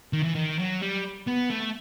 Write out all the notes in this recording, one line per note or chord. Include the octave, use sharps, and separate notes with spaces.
D#3
E3
D#3
F#3
G3
B3
A3